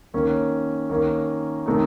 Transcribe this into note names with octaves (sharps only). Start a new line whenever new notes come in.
D#3 A#3 C#4
D#3 A#3 C#4
C3 D#3 A3 D#4